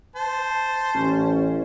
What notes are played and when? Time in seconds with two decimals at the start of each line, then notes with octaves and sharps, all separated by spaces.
0.16 C5 A5
0.95 A1 C#4